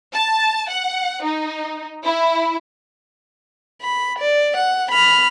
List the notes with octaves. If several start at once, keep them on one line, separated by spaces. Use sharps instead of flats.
A5
F#5
D#4
E4
B5
D5
F#5
B5 F6